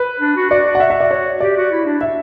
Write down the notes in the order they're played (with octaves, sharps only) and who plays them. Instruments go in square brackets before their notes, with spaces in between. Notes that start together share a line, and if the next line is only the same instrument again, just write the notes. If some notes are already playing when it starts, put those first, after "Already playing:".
Already playing: [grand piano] B4
[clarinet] D4
F#4
[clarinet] F#4 [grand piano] D5
[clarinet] F#4
[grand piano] F#5
E5
E5
D5
C#5
[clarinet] G4 [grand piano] D5
[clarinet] F#4
E4
D4
[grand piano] E5